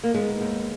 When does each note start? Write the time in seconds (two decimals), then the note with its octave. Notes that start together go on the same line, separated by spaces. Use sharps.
0.04 A#3
0.14 D#3 G#3 B3
0.41 D#2